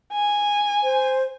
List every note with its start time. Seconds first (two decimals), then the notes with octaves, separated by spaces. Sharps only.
0.13 G#5
0.83 C5